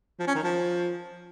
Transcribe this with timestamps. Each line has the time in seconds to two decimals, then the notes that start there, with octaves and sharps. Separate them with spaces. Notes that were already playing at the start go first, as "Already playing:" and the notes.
0.19 F3
0.27 C#4
0.35 D#3
0.43 F3